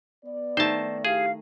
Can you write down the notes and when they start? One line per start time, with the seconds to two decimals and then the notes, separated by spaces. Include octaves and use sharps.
0.24 B3 D5
0.57 D#3 A3 C5 A5
1.05 E4 G4 G#4 F5